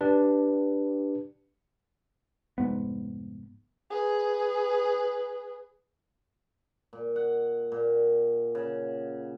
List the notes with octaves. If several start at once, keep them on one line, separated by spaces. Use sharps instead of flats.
D4 G4 B4
F1 G#2 B3
G#4 B4
A#2
F#5
A#2
C#3